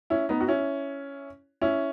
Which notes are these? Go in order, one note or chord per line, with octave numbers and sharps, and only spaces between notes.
C#4 E4
B3 D#4
F#4
C#4 E4
C#4 E4